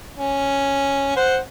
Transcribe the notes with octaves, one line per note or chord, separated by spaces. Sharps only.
C#4
C5 F#5